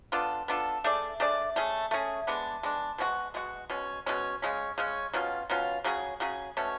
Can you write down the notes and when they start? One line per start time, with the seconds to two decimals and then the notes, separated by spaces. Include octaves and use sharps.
0.12 B3 D4 F4 A4
0.48 B3 D4 F4 A4
0.84 A3 D4 G#4 D5
1.20 A3 D4 G#4 D5
1.56 A3 C#4 G#4
1.91 A3 C#4 G#4
2.27 G#3 B3 D4
2.63 G#3 B3 D4
2.98 B2 G#3 C#4 F#4
3.34 B2 G#3 C#4 F#4
3.70 B2 G#3 C#4
4.06 B2 G#3 C#4
4.42 C#3 G#3 C#4
4.78 C#3 G#3 C#4
5.13 B2 F#3 C#4 F4
5.50 B2 F#3 C#4 F4
5.84 C#3 F#3 C#4 G#4
6.20 C#3 F#3 C#4 G#4
6.57 B2 A3 C#4